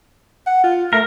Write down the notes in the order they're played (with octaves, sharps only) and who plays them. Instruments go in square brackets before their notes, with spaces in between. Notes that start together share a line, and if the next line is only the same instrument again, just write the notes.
[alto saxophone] F#5
F4
[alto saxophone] A3 [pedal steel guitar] A#4